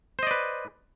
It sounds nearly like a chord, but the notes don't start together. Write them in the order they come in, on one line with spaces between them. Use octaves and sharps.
C5 D#5 D5 B4